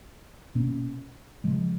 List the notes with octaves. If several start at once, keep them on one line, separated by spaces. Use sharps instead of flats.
B2 A#3 C#4
C#3 F3 G#3